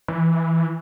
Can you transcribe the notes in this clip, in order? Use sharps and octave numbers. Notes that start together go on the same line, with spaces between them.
E3